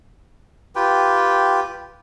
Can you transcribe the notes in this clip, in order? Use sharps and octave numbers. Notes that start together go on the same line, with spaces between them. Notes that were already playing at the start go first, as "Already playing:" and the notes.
F4 G4 B4 G5